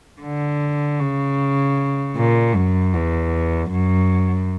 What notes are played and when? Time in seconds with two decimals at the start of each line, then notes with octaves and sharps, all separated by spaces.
0.22 D3
0.99 C#3
2.17 A#2
2.55 F#2
2.94 E2
3.71 F#2